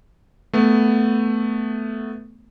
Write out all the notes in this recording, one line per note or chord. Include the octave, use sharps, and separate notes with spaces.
A3 B3